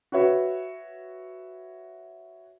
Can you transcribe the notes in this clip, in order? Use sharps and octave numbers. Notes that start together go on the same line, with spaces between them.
F#4 B4 C#5 E5